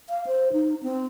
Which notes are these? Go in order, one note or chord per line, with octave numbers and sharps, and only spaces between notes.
F5
C5
D#4
C4